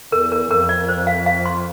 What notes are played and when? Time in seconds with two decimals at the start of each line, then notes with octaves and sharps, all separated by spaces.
0.12 E2 A#4
0.32 A#4
0.51 F2 A#4
0.69 D5
0.88 C5
1.07 F5
1.26 F5
1.46 C6